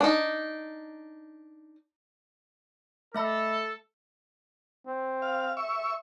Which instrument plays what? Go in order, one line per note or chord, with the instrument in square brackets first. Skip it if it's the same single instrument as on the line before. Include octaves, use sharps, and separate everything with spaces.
[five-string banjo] D4 D#4
[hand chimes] A3 E5 B5 [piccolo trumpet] A4
[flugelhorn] C4
[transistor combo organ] F5
E5 C#6